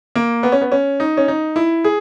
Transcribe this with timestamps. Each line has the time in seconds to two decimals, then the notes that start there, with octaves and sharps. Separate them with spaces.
0.16 A#3
0.43 B3
0.52 C#4
0.61 B3
0.72 C#4
1.00 D#4
1.17 C#4
1.28 D#4
1.56 E4
1.84 G#4